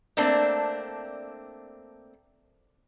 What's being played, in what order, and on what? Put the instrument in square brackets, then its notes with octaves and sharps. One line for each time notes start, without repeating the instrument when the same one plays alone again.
[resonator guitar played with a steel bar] A3 A#3 C4 D4